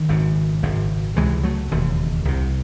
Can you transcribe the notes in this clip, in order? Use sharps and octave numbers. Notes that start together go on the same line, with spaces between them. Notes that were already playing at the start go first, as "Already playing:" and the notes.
Already playing: D#3
G#1 F#2 C#3
G#1 F#2 C#3
C#2 C3 E3 G#3
F#3 A3
E1 D#2 C#3
C2 C3